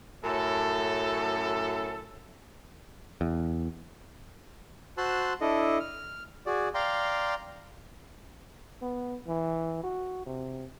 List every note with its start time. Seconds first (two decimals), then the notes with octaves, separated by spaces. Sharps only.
0.23 F#2 A2 A4
3.21 E2
4.98 F#4 C5 A5 C6 E6 F#6
5.41 D4 E4 A4 D#5
5.80 F6
6.46 F#4 G#4 D5
6.75 D5 F5 G5 A#5 C6
8.82 B3
9.27 E3
9.84 F#4
10.26 C3